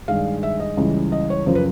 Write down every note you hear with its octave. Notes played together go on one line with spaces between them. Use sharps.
G2 D#3 G#3 F5
E5
D#5
C#2 C#3 E3 G3
D#5
C#5
F#2 C#3 F3 C5
B4